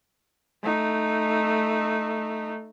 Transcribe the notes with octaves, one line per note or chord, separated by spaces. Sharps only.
A3 D#4